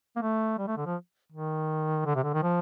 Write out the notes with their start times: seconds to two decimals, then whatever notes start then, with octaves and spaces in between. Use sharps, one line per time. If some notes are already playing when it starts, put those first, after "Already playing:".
0.16 A#3
0.22 A3
0.58 G3
0.67 A3
0.77 D3
0.86 F3
1.32 D#3
2.06 D3
2.15 C3
2.24 D3
2.34 D#3
2.43 F3